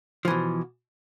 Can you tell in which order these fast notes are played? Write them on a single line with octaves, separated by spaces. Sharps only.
F3 E3 B2